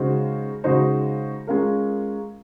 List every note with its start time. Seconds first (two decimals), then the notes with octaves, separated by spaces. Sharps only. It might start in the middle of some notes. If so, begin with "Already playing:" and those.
Already playing: C#3 G#3 D#4 F#4 C5
0.64 C#3 G#3 D#4 F#4 C5
1.47 G#3 C#4 F4 A#4